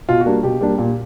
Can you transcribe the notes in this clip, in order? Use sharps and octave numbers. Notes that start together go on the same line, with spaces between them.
B2 F4
F#4
G3 A#3 D4
B2 G4
G3 A#3 D4
A#2